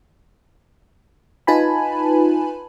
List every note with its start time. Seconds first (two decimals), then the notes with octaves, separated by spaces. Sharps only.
1.47 D#4 F4 B4 G#5 A5 B5